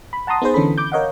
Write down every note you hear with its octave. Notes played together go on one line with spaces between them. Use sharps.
B5
F#5 A5 A#5 C6 D#6
B3 D#4 G#4 B4 C5
D3 E3 C#4 A4 B5
D6 G6
A#4 C#5 D#5 F5 F#5